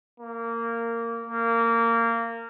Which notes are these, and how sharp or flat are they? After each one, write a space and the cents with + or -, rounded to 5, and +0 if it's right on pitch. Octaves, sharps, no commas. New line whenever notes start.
A#3 -15
A#3 -20